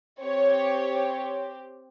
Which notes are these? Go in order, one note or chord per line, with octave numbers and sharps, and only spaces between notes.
C4 G4 C#5